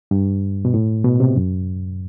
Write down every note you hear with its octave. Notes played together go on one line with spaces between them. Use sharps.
G2
B2
A2
B2
C3
F#2